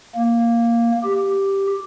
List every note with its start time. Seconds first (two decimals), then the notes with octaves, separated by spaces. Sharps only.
0.15 A#3
1.03 G4